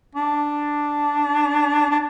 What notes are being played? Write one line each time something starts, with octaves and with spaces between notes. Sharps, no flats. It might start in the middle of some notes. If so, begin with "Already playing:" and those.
D4
D4